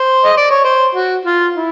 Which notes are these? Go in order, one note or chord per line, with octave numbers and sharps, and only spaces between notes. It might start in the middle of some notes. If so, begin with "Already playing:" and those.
Already playing: C5
D#5
D5
C#5
C5
F#4
F4
E4